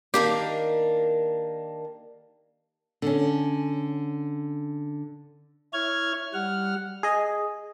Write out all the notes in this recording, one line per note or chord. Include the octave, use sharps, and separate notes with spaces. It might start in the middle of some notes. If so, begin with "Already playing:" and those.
D#3 A#3 D4 G4
D3 C#4
E4 C#5 F6 G#6
G3 F#5 F6
G#4 D#5